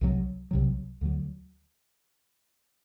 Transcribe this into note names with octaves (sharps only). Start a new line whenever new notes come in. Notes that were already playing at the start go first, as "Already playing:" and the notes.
C2 C3 F#3
C2 C3 F#3
D2 D3 F#3